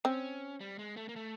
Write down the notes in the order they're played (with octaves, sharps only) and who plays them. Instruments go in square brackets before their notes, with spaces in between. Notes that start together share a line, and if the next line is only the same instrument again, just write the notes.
[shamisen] C4 [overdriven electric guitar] C#4
[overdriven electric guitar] G3
G#3
A3
A#3
A3